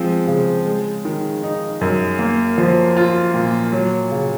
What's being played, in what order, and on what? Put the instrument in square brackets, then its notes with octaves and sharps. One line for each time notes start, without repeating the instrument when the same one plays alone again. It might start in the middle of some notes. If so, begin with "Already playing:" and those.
Already playing: [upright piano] F3 G#3 C4
C#3
G#3
D#3
D#4
F#2
A#3
F3
F4
A#2
F#3
C#3